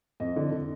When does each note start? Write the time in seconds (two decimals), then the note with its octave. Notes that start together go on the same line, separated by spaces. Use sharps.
0.20 F2 D#5
0.36 D3
0.51 D3